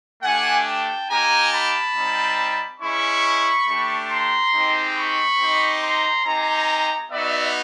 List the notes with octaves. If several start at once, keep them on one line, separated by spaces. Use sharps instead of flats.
A3 D4 G4 F#5 G#5
G5 A5
A#3 D#4 G4 G#5 A#5
A5 B5
G3 C4 D#4
G#3 C#4 E4 B5 C#6
A3 D4 G4
A#5 C6
G#3 C4 D#4 G4
B5 C#6
C4 D#4 G4
A#5 C6
C4 D#4 G4 G#5 A#5
B3 D#4 F#4 D5 E5